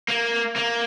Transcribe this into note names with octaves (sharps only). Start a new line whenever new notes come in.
A#3
A#3